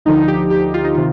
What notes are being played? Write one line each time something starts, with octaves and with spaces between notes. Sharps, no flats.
D2 D3 F3 D#4
G4
G4
F4
D#4
C3 D#3 F4